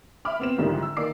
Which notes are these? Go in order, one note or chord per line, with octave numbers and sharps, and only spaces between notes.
E5 B5 D6 F6
B3 C4 E7
C2 G#2 D3 D#3 F3 G3
E6
D#3 A#3 D5 D6 C7